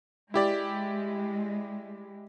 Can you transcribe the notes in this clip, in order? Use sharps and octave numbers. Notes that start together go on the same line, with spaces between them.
G#3 E4 G4 D5